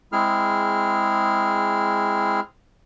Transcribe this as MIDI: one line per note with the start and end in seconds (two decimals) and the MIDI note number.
0.12 2.40 56
0.12 2.40 60
0.12 2.40 64
0.12 2.40 68
0.12 2.40 89